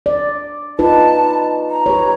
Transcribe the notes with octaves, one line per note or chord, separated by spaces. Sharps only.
D5
D#4 F4 B4 A5
A#5
G4 B4 C#5